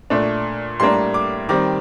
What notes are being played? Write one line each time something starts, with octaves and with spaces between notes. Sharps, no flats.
A#2 A3 D4
A2 G3 A#3 D4 C6
D6
D#3 G3 C4 D6